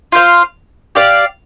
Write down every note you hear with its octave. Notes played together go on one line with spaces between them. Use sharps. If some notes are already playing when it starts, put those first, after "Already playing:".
F4 C5 F5
G4 D5 F5